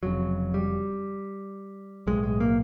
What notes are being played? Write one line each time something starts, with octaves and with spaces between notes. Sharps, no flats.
F1 F2 C#3 F#3
G3
B1 A2 G#3
G#3
A#3